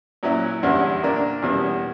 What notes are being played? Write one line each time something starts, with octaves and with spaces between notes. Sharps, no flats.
A#2 F#3 C#4 E4
E2 D3 G3 C#4 E4
A#2 A#3 D4
E2 B2 G3 C#4